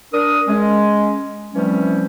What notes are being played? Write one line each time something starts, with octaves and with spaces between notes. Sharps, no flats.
D4 A#4 D#6
G#3 C#4
E3 F3 G3 A3 C4 C#4